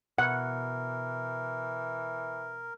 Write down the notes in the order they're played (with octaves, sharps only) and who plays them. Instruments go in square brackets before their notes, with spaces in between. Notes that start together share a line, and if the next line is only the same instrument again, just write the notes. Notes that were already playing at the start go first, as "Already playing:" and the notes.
[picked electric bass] B2 [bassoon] E3 [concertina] A#4 [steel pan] F#5